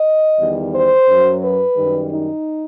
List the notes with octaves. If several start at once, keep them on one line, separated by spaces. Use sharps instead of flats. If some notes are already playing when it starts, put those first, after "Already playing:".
Already playing: D#5
E2 D#3 G3
C5
F#2 F#3
B4
F#2 D#3 G3
D#4